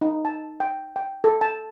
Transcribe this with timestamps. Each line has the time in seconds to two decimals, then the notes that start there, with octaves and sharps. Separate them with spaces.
0.01 D#4
0.25 A5
0.60 G5
0.96 G5
1.24 A4
1.41 A5